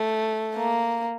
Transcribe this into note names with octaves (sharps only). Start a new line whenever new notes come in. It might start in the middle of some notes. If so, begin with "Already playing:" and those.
Already playing: A3
A#3